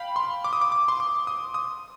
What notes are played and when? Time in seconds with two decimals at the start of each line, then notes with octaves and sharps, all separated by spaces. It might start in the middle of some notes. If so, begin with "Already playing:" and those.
Already playing: F5 G5 B5
0.16 C6
0.44 D6
0.53 D#6
0.61 D6
0.72 D6
0.88 C6
1.00 D6
1.27 D#6
1.54 D#6